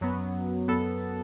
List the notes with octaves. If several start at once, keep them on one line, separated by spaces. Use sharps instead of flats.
F#2 F#3 B3
F#2 F#3 B3 A4